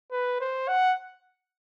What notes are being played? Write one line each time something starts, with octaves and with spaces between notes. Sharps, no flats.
B4
C5
F#5